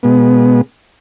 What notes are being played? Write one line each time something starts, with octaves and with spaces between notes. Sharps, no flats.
B2 G#3 B3